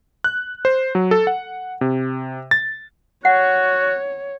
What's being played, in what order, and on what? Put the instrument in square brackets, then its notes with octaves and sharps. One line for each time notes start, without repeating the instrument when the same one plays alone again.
[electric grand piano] F#6
C5
F#3
A4
F#5
C3
A6
[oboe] F#4 [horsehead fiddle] C#5 [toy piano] F#5